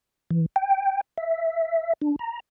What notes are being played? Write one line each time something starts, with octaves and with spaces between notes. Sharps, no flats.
E3
G5
E5
D4
A#5